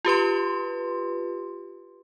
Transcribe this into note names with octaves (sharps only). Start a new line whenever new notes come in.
F4 G4 B4 C6